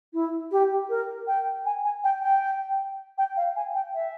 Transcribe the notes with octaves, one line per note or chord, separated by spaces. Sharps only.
E4
G4
A#4
G5
G#5
G#5
G5
G5
G5
F5
G#5
G5
E5